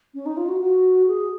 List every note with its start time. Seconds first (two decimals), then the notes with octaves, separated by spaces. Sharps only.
0.14 C#4
0.26 D#4
0.37 F4
0.48 F#4
0.61 F#4
1.07 G#4